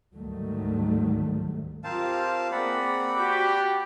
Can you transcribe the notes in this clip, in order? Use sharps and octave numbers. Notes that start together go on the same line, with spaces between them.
D2 G#2 D#3 F#3 G3 A3
C4 F4 G4 A#4 C5 F5 A5
A#3 C4 G#4 D5 F#5 B5
F#4 G4 D6